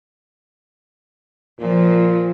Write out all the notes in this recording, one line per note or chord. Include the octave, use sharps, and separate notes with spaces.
A#2 F3